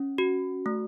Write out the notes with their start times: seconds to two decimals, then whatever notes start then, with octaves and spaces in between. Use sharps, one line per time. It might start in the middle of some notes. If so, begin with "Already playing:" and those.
Already playing: C#4
0.18 F#4
0.66 A3